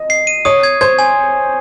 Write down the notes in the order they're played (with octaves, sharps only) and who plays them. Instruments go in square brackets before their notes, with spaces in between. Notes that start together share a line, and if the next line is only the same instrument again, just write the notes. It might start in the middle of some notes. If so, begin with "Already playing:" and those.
Already playing: [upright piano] D#5
[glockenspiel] C7
D#7
[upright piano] C#5 [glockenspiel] D#6
[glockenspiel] G#6
[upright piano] C5 [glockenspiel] G#6
[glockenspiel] G#5